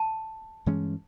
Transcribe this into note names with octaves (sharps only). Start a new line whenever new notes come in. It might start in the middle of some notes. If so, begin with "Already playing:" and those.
Already playing: A5
G2 E3 G#3 C#4